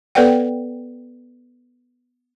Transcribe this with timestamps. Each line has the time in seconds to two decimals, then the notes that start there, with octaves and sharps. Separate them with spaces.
0.15 B3 A4 B4 D5 F#5 G5